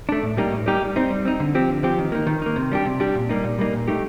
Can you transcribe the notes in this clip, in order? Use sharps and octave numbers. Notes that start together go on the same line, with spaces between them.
A3 D4
A2
G3 A#3 D#4 G4
A2
G3 A#3 D#4 G4
G3
C4 D#4
G3
C4 D#4
D3
F3 C4 G4
D3
F3 C4 G4
D#3
A#3 D#4
D#3
A#3 D#4
C3
G3 D4 G4
C3
G3 D4 G4
A#2
G3 A#3 D#4
A#2
G3 A#3 D#4
A#2
A3 D#4 G4